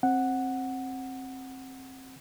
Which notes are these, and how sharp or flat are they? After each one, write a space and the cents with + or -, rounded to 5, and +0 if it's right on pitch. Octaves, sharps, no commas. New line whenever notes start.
C4 +15 F#5 +0